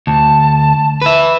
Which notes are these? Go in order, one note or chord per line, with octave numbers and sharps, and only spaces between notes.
D2 A5
B4 E5